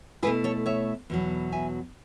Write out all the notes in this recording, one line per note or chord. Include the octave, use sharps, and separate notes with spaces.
B2 A3 E4 G#4 B4
A4 C#5
C#5 E5
E2 B2 F#3
E5 G#5